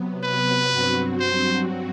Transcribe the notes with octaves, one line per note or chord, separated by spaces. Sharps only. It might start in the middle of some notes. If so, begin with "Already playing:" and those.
Already playing: C3 F#3 B3
B4
G2 F#3 C4 F#4
C5